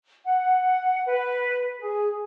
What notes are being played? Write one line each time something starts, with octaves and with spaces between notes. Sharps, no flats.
F#5
B4
G#4